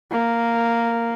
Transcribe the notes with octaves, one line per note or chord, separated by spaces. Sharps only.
A#3